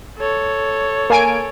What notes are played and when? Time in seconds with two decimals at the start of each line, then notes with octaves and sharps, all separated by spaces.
0.18 A4 C#5
1.10 A#3 G#5 D7